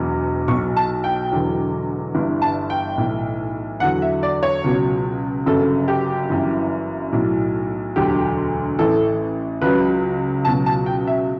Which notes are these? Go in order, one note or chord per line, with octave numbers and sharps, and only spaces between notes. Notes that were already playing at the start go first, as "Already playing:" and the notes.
Already playing: E1 E2 B2 F#3
B1 B2 F#3 C#6
A5
G5
E1 E2 D3 F#3
G1 G2 E3
A5
G5
B1 A2 E3
E2 D3 F#3 F#5
E5
D5
C#5
C#2 B2 F#3
G1 F#2 C#3 F#3 A4
G4
G1 F#2 E3
B1 A2 F#3
E1 D2 D3 F#3 G4
A1 A2 E3 A4
C#2 C#3 F#3 B4
C#2 B2 F#3 A5
A5
G5
E5